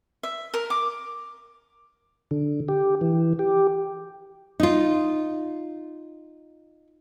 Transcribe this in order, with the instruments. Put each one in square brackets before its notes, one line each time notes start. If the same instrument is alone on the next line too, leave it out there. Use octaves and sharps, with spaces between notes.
[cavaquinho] E5
A#4
D6
[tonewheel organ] D3
G4
E3
G4
[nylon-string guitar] D#4 F4